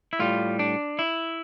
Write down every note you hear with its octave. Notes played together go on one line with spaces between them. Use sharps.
E4
A2 G3 F4
D4
E4